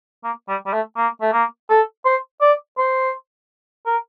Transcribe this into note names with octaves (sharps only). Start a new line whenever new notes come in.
A#3
G3
G3
A3
A#3
A3
A#3
A4
C5
D5
C5
A#4